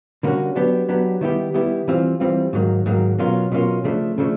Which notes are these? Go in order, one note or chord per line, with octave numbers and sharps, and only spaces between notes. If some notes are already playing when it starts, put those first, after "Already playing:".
D3 G3 A#3 C#4 F#4
F#3 B3 D4 G4
F#3 B3 D4 G4
D#3 G3 B3 E4 G4
D#3 G3 B3 E4 G4
E3 G3 C4 F4
E3 G3 C4 F4
G#2 D#3 F#3 A#3
G#2 D#3 F#3 A#3
B2 F#3 A#3 C#4 F4
B2 F#3 A#3 C#4 F4
C#3 F3 A3 D4
C#3 F3 A3 D4